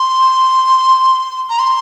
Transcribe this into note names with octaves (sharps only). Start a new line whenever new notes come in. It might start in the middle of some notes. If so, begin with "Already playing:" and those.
Already playing: C6
A#5
C6